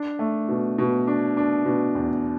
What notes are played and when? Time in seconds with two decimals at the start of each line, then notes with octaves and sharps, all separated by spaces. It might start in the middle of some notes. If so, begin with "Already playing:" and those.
Already playing: D4
0.19 A3
0.49 B2
0.78 B2
1.07 D4
1.37 D4
1.66 B2
1.95 E2